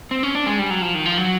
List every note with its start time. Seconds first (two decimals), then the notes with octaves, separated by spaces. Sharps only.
0.11 C4
0.23 C#4
0.35 D4
0.47 G#3
0.59 G3
0.70 F#3
0.82 F3
0.95 D#3
1.06 F3
1.18 F#3